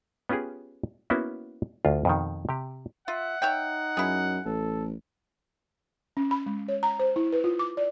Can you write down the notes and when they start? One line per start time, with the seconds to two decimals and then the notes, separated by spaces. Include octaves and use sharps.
0.29 B3 C#4 F4 G4 G#4
1.10 A#3 B3 C#4 E4 F#4
1.85 D2 F4
2.05 F2 B2 D#3
2.49 C3 G4
3.08 F4 E5 F#5
3.42 D#4 C#5 E5 G5
3.97 F#2 E4 G#4
4.45 A1 A4
6.17 C#4
6.31 B5
6.46 G#3
6.68 C#5
6.83 A#5
6.99 C5
7.16 E4
7.33 B4
7.44 F4
7.59 D6
7.77 D5